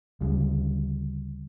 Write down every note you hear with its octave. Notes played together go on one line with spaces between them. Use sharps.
D2 C#3 G3